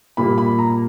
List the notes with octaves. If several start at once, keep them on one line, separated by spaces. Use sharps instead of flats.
A#2 G3 A#3 B5
B5
A#5